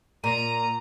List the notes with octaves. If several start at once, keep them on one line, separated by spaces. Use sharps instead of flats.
A#2 A#5 D#7